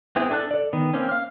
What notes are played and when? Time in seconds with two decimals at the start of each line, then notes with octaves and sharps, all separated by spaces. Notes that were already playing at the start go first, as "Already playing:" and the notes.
0.16 B3 C4 E4 G#4
0.31 D4 A4 A5 F#6
0.51 A4 D5
0.73 D#3 B3
0.93 A#3 C4 C#4
1.09 F5 F6